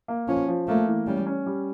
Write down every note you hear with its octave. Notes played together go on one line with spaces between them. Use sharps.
A#3
F3 C#4
F3
A3 A#3
E3
G3 C#4
C#4
G3